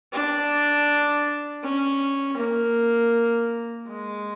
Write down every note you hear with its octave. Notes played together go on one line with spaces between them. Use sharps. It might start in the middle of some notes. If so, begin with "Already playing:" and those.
D4
C#4
A#3
G#3